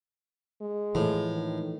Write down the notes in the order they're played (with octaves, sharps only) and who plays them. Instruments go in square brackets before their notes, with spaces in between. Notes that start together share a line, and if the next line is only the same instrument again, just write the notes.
[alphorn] G#3
[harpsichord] A2 [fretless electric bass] E3 F3
[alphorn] D#3